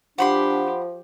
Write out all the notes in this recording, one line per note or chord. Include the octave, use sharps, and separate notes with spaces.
F3 D4 G4 F#5 B5 C6